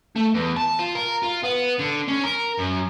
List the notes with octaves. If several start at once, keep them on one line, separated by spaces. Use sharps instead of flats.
A3
E2
A5
F4
A#4
F4
B3
D3
C#4
A#4
F#2